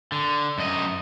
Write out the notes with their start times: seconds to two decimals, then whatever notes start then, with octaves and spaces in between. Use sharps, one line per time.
0.12 D3
0.58 F#2 D#5